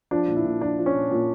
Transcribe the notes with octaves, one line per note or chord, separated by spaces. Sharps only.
F3 D4
A#2
E4
A#2
F3 D4
F3
C#4
A#2
A#2